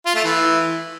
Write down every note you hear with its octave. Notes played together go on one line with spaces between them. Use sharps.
F4
A3
E3